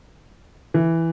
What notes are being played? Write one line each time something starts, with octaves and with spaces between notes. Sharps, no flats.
E3